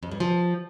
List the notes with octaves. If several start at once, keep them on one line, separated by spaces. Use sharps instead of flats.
F2
G2
F3